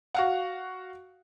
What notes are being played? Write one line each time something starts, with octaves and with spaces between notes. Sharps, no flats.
F#4 F5 F#5